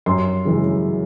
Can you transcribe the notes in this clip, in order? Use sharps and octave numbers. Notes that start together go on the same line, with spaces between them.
F#2 C6
C#3 E3 G#3